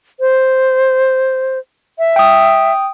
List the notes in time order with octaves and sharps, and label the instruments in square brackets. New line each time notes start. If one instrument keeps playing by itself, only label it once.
[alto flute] C5
E5
[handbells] G5 D#6